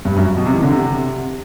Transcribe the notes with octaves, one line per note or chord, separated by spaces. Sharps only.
G2
F#2
B2
C3
E3
D3
C3